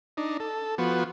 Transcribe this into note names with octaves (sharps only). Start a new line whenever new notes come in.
D4 D#4
A4
F3 B3 F#4